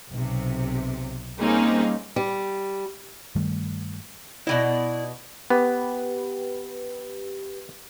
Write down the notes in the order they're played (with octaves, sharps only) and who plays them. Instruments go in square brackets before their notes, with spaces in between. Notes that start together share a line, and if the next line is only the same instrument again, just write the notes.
[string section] B1 C3
G3 A#3 C4 C#4 D#4 G#4
[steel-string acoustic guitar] G3
[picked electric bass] G2 D#3 G3 A3
[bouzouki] B2 E3 D#5 [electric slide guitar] E4 D5
[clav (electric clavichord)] B3 [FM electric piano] G4 B4